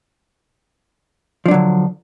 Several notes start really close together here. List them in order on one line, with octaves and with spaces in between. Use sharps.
F3 D4 F#3 D3